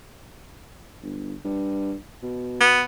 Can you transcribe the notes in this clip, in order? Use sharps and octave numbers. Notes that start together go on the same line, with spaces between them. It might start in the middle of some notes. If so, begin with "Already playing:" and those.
G1
G2
B2
B3